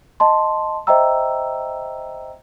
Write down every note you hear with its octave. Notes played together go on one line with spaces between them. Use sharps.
D#5 A5 C6
C5 D#5 E5 G5 A#5 E6